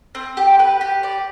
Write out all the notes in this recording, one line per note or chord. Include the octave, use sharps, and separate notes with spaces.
C4
G4
B4
G4
D5